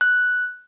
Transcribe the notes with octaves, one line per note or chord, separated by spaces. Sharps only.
F#6